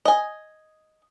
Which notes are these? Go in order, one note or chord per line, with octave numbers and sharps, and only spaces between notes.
D#5 G#5